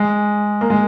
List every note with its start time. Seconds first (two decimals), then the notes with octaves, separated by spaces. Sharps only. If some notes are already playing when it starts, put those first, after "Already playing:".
Already playing: G#3
0.61 A#3
0.70 G#3